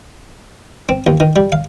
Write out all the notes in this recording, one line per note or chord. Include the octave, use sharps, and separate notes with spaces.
C4
D#2
D#3
G3
F5